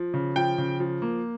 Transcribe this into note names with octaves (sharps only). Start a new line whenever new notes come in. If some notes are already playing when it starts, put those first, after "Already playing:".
Already playing: F3
C#3
F3 G5
C#3
F3
A#3